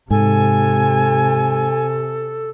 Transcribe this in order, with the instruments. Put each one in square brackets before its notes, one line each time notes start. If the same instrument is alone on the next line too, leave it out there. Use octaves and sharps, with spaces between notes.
[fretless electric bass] G#2 [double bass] C3 [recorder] A4 [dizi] G#5